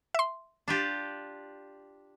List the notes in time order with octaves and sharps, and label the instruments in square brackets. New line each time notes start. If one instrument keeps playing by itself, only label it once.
[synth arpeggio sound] E5 C6
[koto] D4 F4 G4